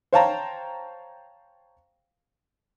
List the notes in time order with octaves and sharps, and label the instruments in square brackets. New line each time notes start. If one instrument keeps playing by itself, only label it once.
[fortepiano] C5 C#5 F5 G5 A5 A#5